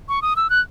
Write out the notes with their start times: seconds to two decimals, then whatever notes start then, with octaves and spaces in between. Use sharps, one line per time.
0.09 C#6
0.22 D#6
0.36 E6
0.50 F#6